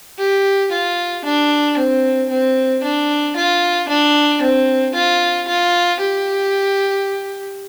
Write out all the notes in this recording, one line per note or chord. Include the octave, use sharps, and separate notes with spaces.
G4
F4
D4
C4
C4
D4
F4
D4
C4
F4
F4
G4